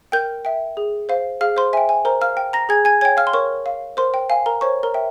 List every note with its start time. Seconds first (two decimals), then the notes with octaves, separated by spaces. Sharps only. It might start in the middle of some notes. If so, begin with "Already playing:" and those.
0.12 A#4 G5 G6
0.45 E5 G5
0.77 G#4
1.09 C5 F5
1.41 G#4 F5 F6
1.57 C5 C6
1.73 E5 G5 G#5
1.89 G#5
2.05 A#4 C5 A#5
2.21 F5 F6
2.37 G5
2.53 A#5 A#6
2.69 G#4 G#5 G#6
2.85 G#5 G#6
3.01 C#5 G5 G#5 G#6
3.17 F5 F6
3.27 C6
3.33 A#4 C#5 C#6
3.66 F5
3.97 A#4 C5 C6
4.14 G5
4.30 F5 G#5
4.46 A#4 A#5
4.61 C5 C#5 C#6
4.83 A#4 A#5
4.94 E5 G5